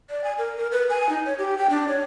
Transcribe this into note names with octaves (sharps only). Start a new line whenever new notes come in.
D5
G#5
A#4
A#4
B4
G#5
D#4
C#5
G4
G5
D4
C#5